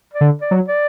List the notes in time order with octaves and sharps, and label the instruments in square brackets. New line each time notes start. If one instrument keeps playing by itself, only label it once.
[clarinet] D5
[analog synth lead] D3
[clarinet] D5
[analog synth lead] F#3
[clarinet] D5